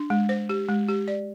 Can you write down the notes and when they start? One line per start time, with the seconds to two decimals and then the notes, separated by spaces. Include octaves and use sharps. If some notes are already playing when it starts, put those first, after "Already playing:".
Already playing: D4
0.10 G#3
0.29 C5
0.49 G4
0.69 G#3
0.89 G4
1.08 D5